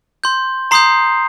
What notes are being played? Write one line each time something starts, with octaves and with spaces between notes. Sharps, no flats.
C6 G6
A#5 C6 D#6 G6 C7